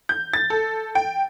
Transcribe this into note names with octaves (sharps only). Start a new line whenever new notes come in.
G6
A6
A4
G5